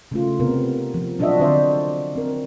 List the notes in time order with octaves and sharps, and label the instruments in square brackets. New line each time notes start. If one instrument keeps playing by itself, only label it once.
[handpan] C#3 A3 F4
C3 B3 C4 A#4
F3
F#3 D4 F4 F#4 D#5 E5
D3 C4 D4 C5 D5 E5
C4 A#4